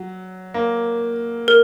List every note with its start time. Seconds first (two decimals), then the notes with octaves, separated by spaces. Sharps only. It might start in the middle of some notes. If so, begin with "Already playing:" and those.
Already playing: F#3
0.54 A#3
1.48 A#4